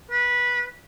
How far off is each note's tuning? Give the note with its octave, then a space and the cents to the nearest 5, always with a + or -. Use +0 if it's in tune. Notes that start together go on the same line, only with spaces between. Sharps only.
B4 -15